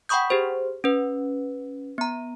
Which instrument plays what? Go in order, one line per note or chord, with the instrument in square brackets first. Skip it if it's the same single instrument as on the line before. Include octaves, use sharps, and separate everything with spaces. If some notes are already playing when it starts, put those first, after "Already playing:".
[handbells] F#5 G5 B5 C#6 D#6 G6
G4 G#4 C5
C#4 B4
B3 A#5